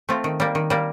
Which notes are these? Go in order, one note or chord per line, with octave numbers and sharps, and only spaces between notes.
A3 C4 F4
D#3
G3 A#3
D#3
G3 A#3